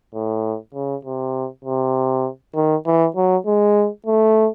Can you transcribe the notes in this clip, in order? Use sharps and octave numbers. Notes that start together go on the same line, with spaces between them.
A2
C#3
C3
C3
D#3
E3
F#3
G#3
A3